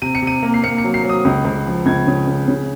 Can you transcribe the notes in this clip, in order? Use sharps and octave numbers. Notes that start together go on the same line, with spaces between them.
C3 D#7
C#7
C3 D#7
A#3
C7
A#3 C#7
C#7
F#3
C7
F#3
D#6
C#2
C#2
F3
C#2 G#6
C#3
C#3
C#3